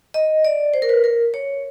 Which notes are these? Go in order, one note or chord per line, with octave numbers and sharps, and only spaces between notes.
D#5
D5
C5
A#4
B4
A#4
C#5